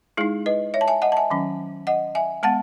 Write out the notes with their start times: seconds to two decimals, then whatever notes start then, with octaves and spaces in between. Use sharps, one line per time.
0.17 G#3 D#4 E4 G#4
0.46 B4 D#5
0.74 C#5 E5
0.81 A5
0.88 E5 G#5
1.02 D#5 F#5
1.12 A5
1.17 E5 G#5
1.30 D#3 F#3 C#4
1.87 D#5 F#5
2.15 E5 G#5
2.43 G#3 B3 F#5 A5